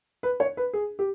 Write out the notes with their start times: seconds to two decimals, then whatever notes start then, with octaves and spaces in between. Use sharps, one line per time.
0.23 B4
0.40 C#5
0.57 B4
0.73 G#4
0.99 G4